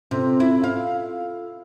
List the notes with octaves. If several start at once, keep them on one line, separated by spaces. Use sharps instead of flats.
C3 F4 A4 E6
E4
F5